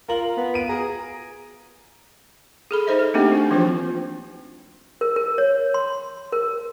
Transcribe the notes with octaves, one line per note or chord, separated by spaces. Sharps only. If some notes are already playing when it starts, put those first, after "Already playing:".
F4 A#4 F#7
B3
D7 D#7
G#4 A#5
G#4 A4 B5
D#4 C5 D#5 E5
A4
A3 A#3 C4 D4 D#4 G4
D4 F#4
E3 F3 C4 D4 F4 C5
A#4
A#4
C#5
C6
A#4